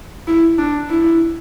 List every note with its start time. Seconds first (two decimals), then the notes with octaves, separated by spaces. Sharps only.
0.27 E4
0.58 D4
0.89 E4